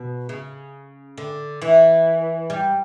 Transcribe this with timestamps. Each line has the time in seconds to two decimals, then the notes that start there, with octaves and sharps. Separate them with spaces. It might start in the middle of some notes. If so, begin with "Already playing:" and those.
Already playing: B2
0.29 C#3
1.18 D3
1.62 E3
2.50 G3